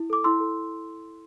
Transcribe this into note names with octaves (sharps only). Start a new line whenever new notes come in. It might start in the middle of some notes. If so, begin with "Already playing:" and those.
Already playing: E4
A4 D6
E4 C6 E6
A4